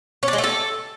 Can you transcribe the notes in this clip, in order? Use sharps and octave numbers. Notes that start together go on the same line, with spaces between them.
C#4
D4
G#3
A3
A4